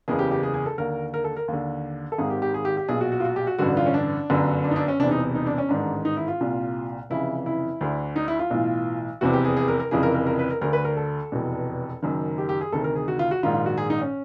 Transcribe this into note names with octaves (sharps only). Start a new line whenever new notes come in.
F#1 E2 C#3 G#4
G4
G4
G#4
G#4
A4
D#2 D3 A#4
A#4
A4
A#4
D#2 D3
A4
G#1 G#2 D#3 G#4
G4
G4
G#4
G4
G4
B1 A#2 G#4
F#4
F#4
F4
F#4
G4
F#4
A1 G2 D3 F#4
F4
C#4
D4
G1 F#2 D3
D4
D#4
D4
C#4
E1 E2 C3 D4
D#4
D#4
D4
C#4
A1 G#2 D#3 D4
D#4
E4
F4
C2 A#2
F1 F2 C#3 E3 E4
E4
D2 D3
D#4
E4
F4
B1 A2 E3
F1 E2 C3 F#4
G4
G#4
G#4
A#4
A#4
F1 F2 C#3 E3 G#4
A#4
A#4
A#4
B4
A#4
D2 D3 A#4
B4
A#4
A4
F1 E2 B2
F#1 F#2 D#3
G4
G4
G#4
D2 C3 D#3 A4
A#4
G#4
F#4
F4
F#4
A#1 G#2 D#3 F4
F4
F#4
G#4
D#4
C#4